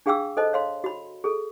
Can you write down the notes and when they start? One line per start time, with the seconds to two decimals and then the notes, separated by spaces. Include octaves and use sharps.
0.06 D4 G#4 F5 G5 D6 E6
0.37 A4 C5 D#5 A5
0.53 C#5 F5 C6
0.84 F#4 B5
1.24 G#4 A4